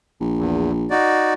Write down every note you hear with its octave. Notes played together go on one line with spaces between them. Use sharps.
A#1
E2
D#4 F#4 D5